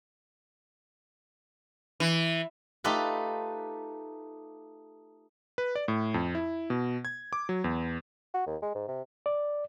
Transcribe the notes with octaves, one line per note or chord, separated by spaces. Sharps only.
E3
A3 D#4 F4 G4 A4 B4
B4
D5
A2
F2
E4
B2
G#6
D6
F#3
E2
F#4
D#2
G#3
G#2
C3
D5